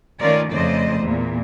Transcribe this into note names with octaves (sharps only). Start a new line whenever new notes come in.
D#3 A3 C#4 F4 A#4 D5
F2 C#3 A3 C5 D5 D#5
E2 A#2